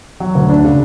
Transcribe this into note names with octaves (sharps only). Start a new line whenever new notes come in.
F#3
D2
D4
C#3